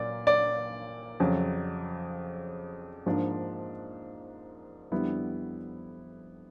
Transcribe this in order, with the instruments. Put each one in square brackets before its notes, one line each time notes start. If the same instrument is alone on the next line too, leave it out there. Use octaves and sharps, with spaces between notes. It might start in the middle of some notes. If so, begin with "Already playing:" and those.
Already playing: [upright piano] A#2 F#3 A#3 D5
D5
F2 C#3 F#3
G#2 F3 A#3 D4
F2 D3 G3 B3 E4